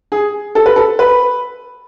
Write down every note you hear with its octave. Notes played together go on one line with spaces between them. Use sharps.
G#4
A4
B4
A4
B4